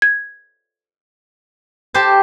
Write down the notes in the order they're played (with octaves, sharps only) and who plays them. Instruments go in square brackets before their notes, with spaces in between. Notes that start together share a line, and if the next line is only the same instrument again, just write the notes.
[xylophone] G#6
[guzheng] G4 C5 A5